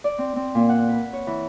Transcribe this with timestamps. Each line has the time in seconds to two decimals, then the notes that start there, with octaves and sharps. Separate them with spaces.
0.04 D5
0.18 C4
0.36 C4
0.55 A#2
0.69 F#5
0.89 B4
1.13 C#5
1.27 E3